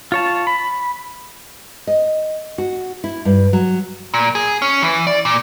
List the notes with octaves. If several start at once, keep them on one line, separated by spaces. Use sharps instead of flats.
F4 C#5 A5
B5
D#5
F#4
E4
G2
F#3
A#2
G#4
C#4
E3
D5
A#2